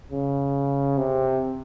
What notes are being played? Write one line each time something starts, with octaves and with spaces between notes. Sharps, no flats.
C#3
C3